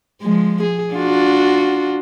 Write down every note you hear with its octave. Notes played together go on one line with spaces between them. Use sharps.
F3 G#3
G#4
D4 F4 F#4